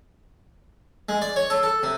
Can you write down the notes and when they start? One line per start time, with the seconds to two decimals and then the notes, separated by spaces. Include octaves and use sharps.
1.09 G#3
1.22 D5
1.36 C#5
1.50 A4
1.63 A4
1.83 C3